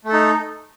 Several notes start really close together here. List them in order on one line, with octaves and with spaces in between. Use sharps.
A3 A4 D#4